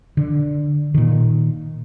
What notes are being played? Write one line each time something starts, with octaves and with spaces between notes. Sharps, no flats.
D3
A#2 D#3